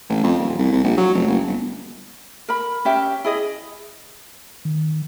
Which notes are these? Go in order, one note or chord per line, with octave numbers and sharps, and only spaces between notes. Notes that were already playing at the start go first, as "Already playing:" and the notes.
A1
F2
D#1
C2
C2
A#1
F#3
F1
F#1
G1
A#4 B5
C#4 G4 E5 G5
E4 G#4 D#5
D#3